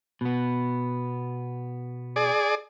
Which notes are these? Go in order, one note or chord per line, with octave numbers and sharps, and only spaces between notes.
B2 B3
G#4 D5